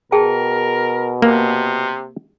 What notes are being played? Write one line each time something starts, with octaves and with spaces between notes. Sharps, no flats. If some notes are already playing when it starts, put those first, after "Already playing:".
B2 G#4 A#4 G5 A5
C3 A#3